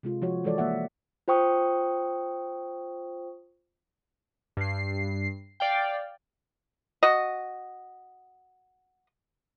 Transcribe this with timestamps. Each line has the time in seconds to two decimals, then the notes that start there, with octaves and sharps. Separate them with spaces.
0.03 C3 G#3 F4
0.22 F3 F#4 C#5
0.44 E3 G#3 A4 C#5 D5
0.58 G#3 A#3 E5 F#5
1.28 F4 C5 G5 C#6 D#6
4.57 G2 C7
5.60 D5 F5 G5
7.03 F#4 D#5